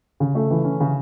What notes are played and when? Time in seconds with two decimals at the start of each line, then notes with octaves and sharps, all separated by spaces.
0.20 C#3
0.35 A3
0.51 E3
0.65 C#4
0.80 C#3